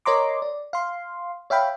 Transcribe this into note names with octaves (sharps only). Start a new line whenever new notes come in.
A#4 C#5 D#5 A#5 C6 D6
D5
F5 C6
C#5 E5 F5 G5 B5